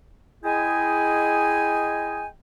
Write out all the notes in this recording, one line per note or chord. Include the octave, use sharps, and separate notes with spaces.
G#3 E4 G#4 D#5 G5 G#5